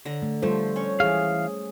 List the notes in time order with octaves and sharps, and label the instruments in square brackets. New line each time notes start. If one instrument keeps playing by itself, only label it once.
[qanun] D3 A#5
[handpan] A3
[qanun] F3 A3 [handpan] G3 A4 C5
[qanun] C#4 C#5
[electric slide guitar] E3 F5 [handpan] G#4